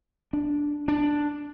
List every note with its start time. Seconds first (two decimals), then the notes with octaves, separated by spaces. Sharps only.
0.33 D4
0.88 D4